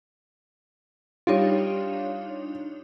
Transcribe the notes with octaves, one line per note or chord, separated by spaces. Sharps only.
G3 D4 D#4 F4 C#5